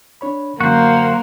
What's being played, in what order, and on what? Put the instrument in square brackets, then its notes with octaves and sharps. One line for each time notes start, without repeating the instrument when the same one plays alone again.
[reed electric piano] D4 C#5 B5
[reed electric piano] F#2 D3 F#3 [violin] A#3 [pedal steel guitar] F#4 C5